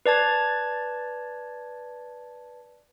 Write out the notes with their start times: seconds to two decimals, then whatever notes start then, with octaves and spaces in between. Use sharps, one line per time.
0.06 B4 D5 A5 G#6